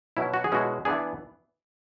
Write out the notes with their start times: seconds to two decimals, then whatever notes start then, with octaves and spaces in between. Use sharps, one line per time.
0.17 B2 F#3 C#4 E4
0.34 F#4
0.44 G#4
0.52 B2 G#3 C#4 E4 F#4
0.85 E3 B3 D4 G#4